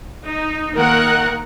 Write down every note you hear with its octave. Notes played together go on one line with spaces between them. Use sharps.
D#4
D#3 A#3 A#4 F#5